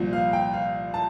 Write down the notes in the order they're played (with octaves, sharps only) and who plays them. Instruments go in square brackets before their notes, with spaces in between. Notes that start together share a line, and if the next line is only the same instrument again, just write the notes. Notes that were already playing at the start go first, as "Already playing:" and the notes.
Already playing: [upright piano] C2 A#2 F3
F5
G5
F5
A5